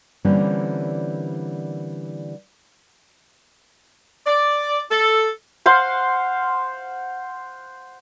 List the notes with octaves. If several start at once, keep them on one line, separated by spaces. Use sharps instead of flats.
D3 E3 G3 A#3 C4 C#4
D5
A4
C5 F5 F#5 C6